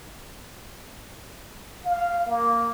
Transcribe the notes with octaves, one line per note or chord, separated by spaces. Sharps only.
F5
A#3